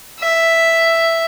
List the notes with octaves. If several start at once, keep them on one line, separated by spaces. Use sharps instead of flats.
E5